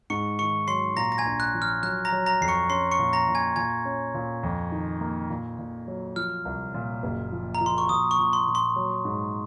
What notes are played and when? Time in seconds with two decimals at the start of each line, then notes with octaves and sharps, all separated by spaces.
0.10 G#2 C#6 C#7
0.39 D#3 C#6 C#7
0.67 F#3 C6 C7
0.96 A#2 A#5 A#6
1.12 A#6
1.18 G#5 G#6
1.25 A#1
1.40 F#6
1.54 F3
1.62 F6
1.83 F#3 F#6
2.05 A#5 A#6
2.12 F#3
2.26 A#5 A#6
2.41 F2 C7
2.48 C#6 C#7
2.70 C#4 C6 C7
2.91 C#6 C#7
2.99 A#2
3.13 A#5 A#6
3.28 A#2
3.35 G#5 G#6
3.56 A#2 G#5 G#6
3.85 C#4
4.14 A#2
4.43 F2
4.72 D#3
5.01 A#3
5.30 A#2
5.58 A#2
5.88 F#3
6.16 F3 F6
6.45 C2
6.74 A#2
7.03 F#1
7.32 F3
7.55 A#5
7.61 F3
7.66 C6
7.78 C#6
7.89 A#2 D#6
8.11 C#6
8.18 A#2
8.33 C6
8.48 A#2
8.55 C6
8.76 F#3
9.05 G#2